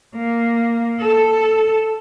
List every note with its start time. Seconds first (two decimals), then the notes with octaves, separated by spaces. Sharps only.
0.16 A#3
1.00 A4